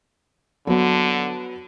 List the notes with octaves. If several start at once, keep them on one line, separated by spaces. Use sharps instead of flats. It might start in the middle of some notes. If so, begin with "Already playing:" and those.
D3 F#3 B3